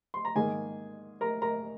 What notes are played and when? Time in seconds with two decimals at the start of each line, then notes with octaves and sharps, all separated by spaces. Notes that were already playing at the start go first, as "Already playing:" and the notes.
0.14 C6
0.25 A#5
0.35 G#2 D#3 A#3 G#4 G#5
1.21 A#4 A#5
1.42 A#4 A#5